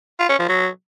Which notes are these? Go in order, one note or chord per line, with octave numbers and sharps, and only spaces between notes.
F4
C#4
F3
F#3